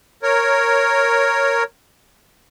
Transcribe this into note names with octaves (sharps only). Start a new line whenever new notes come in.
A#4 C#5